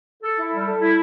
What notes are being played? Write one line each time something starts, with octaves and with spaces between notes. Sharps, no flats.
A4
E4
G3
A4
E4